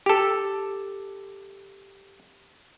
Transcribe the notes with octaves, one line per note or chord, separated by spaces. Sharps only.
G4 A4